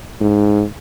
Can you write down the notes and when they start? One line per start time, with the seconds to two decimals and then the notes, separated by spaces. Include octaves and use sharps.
0.21 G#2